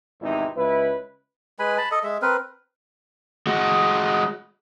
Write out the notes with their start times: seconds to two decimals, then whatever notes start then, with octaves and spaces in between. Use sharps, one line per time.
0.21 G#1 E2 C3 D#4 E4
0.57 C#2 E4 B4
1.59 G#3 B4 G#5 B5
1.78 A5 B5
1.91 A4 D#5
2.03 G#3 E5
2.22 C4 A#4 B4
3.47 G#3 F#4